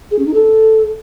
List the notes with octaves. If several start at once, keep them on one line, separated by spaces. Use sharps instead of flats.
G#4
C#4
D#4
A4